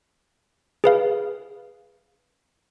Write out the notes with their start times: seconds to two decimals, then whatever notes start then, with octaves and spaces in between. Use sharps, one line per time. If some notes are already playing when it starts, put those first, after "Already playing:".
0.84 G#4 B4 F5